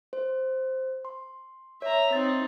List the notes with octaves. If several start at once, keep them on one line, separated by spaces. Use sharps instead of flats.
C5
C6
C#5 E5 A#5
C4 D#4 A6